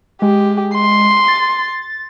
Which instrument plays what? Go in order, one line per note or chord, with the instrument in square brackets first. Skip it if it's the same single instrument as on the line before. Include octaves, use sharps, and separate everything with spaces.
[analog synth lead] G#3 [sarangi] G4
[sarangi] C6
[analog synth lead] A6